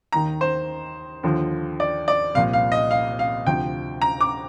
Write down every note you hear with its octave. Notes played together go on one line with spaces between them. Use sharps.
D#2 D#3 A#5
C5
D#2 D3 F3
D5
D5
C2 A#2 F3 F5
F5
D#5
F5
F5
D2 C3 F3 G5
A#5
D6